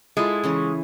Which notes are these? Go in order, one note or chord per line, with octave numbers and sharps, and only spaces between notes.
G#3 E4 F4 A4
C#3 E3 C#4